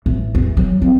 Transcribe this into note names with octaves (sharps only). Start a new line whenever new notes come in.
A1
E2
F#3
C4